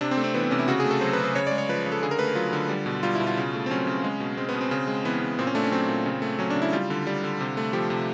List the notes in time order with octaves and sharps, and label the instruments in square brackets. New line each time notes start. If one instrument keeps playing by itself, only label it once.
[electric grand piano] C3 D4
C4
A3
C4
E3 B3
C4
C3 C#4
E4
C#3 F#4
A3 G#4
A4
F#3 C5
B4
C#3
C5
C#3 C#5
G#3 D5
C#5
F3 B4
C#3
A4
D3 G#4
A#4
A3 B4
A#4
F#3 F4
D3
G3
B2
G3 F4
B2 E4
F4
C#3
A3
C4
F#3 C#4
C#3
G#3
B2
G#3 C4
B3
B2
C4
C#3
G#3
E3 B3
C#3
A#2 C4
C#4
A3 D4
C#4
F#3 C4
A#2
C#3
A3
F#3 C#4
D4
C#3
E4
G3 F4
D3
G3
D3
C3
A3
F3 G4
C3